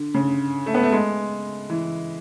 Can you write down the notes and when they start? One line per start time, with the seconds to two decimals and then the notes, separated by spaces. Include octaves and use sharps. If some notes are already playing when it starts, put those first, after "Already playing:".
Already playing: D3
0.14 C#3
0.66 A3
0.74 B3
0.83 A3
0.92 G#3
1.70 E3